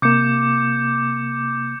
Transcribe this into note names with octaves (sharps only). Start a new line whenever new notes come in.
C3 A#3 D6 G6 C#7